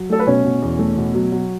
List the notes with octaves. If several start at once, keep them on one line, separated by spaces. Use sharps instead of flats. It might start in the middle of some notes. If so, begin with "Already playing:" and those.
Already playing: F#3
A3 A4
B4
B2 C#4 C#5
B2
E2
A3
B2
F#3
F#3